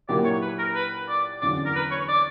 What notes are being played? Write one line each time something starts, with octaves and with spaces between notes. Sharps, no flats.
A#2 F#3 A#3 E4 G4 D5
C#5
B4
A#4
B4
D5
E2 D3 F#3 C#4 D5
A#4
B4
C#5
D5